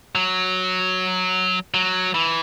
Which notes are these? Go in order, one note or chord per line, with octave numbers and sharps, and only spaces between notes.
F#3
F#3
E3